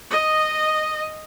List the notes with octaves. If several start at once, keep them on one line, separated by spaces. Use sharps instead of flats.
D#5